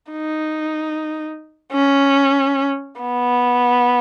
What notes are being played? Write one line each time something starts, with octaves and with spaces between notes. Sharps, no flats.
D#4
C#4
B3